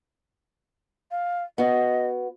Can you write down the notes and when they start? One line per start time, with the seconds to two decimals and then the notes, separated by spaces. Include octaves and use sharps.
1.11 F5
1.58 B3 F#4 D#5